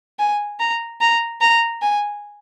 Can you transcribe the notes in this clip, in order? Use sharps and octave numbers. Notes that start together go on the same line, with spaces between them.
G#5
A#5
A#5
A#5
G#5